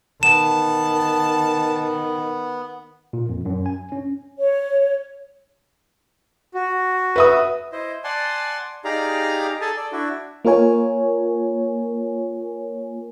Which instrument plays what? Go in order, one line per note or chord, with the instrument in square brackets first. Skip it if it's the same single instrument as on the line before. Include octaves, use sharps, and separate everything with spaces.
[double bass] D#3 [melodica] B3 [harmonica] A5 [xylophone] E7
[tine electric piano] A#2
F2
F#2
G#5
C#4
[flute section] C#5
[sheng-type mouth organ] F#4
[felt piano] B4 E5 D#6
[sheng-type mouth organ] E4 C5 D#5
D5 F#5 G#5 A5 C6
D#4 G4 G#4 D5 F5 A#5
G#4 A4 G#5 A5
A4 D5
D4 E4 F#4
[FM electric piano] A#3 F4 A#4 C#5 G#5